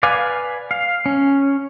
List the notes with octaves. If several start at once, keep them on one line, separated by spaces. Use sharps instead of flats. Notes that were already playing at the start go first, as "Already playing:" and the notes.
B4 D5 F5 G#5
F5
C#4